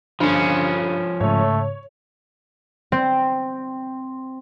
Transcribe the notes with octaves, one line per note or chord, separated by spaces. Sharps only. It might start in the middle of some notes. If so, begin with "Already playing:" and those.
G2 D3 F3 C#4
G#2 C#3 A3 C#5
C4